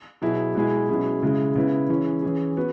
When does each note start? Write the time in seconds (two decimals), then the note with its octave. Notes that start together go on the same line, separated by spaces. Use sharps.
0.22 B2 F#3 E4 G#4
0.55 B2 G#3 E4 G#4
0.89 B2 F#3 C#4 E4 G#4
1.23 C#3 G#3 E4 G#4
1.55 C#3 G#3 B3 E4
1.89 E3 C#4 E4 G#4
2.22 E3 C#4 G#4
2.57 B3 F#4